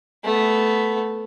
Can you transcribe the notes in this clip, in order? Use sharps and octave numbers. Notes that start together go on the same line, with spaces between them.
A3 B3